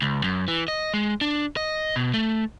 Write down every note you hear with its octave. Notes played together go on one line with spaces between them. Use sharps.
C#2
F#2
E3
D#5
G#3
D4
D#5
B2
A3